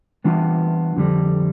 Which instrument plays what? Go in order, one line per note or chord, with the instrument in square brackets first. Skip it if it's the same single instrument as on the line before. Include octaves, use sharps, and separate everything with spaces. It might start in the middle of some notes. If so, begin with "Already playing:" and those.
[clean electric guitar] E3 G3 B3 D4 F4
F2 D3 G3